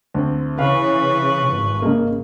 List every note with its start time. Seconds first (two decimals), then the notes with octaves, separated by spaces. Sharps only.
0.14 D2 C4
0.59 C#3 E3 B4 F5 C#6
1.49 G#1
1.82 C#3 G#3 A#3